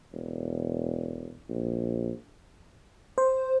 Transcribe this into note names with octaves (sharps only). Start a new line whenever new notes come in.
E1
A#1
C5